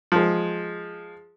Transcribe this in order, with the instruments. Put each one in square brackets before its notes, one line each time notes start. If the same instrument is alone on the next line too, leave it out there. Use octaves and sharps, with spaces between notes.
[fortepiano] F3 G#3